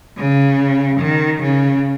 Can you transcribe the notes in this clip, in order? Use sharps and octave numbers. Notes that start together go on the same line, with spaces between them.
C#3
D#3
C#3